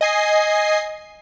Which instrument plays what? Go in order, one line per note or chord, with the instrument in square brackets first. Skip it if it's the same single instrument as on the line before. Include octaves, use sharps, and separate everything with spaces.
[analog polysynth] D#5 G#5 C7